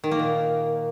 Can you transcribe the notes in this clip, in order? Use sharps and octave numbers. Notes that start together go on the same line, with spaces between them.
D#3
A#3
A#2